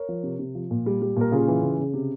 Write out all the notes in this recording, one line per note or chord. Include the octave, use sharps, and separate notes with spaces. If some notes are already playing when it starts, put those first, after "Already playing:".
Already playing: A#4 C#5
F3
C3
C3
F3
A#2
G3
G3
A#2 A#4
C#3 F4 G#4
E3
C#3
C#3
C3